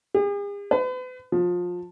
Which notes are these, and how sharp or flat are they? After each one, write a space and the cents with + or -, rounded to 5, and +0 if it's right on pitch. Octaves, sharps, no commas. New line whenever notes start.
G#4 -45
B4 +40
F3 +25